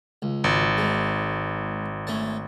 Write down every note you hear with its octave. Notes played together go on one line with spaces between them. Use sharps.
C#2
G#1
G#2 G#3
A3 C#4 A5